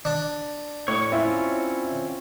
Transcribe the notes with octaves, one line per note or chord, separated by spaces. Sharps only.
D4
A2 C#5 C#6
C4 C#4 E4 F4